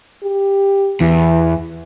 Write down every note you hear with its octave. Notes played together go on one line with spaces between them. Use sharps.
G4
E2 E3